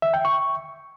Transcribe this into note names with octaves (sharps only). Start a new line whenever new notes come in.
E5
G5
C#6